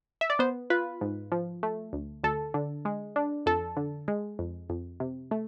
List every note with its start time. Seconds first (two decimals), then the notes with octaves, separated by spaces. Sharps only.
0.21 E5
0.30 D5
0.39 B3 C5
0.70 F4 B4
1.01 G#2
1.32 F3
1.63 A3
1.93 D2
2.24 D2 A4
2.54 D3
2.85 G#3
3.16 D4
3.46 F2 A4
3.77 D3
4.08 G#3
4.39 F2
4.70 F2
5.00 C3
5.31 A3